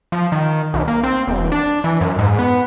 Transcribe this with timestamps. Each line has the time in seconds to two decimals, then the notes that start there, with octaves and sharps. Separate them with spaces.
0.12 F3
0.32 D#3
0.74 B1
0.88 A#3
1.03 C4
1.27 E1
1.52 D4
1.84 E3
2.01 F#2
2.19 G#2
2.39 B3